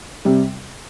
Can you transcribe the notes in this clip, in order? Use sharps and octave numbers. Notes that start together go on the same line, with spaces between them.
C3 G3